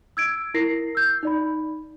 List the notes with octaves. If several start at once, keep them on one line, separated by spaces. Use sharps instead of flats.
E6 G#6 D7
E4 A#4 A#6 C7
E6 G6
D#4 D5 B5